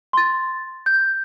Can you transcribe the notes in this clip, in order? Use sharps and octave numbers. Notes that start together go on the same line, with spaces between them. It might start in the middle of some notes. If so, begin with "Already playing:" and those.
C6 A6
G6